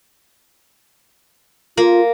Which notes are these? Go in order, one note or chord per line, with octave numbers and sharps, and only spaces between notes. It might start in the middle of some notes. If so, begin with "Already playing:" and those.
A#3 F4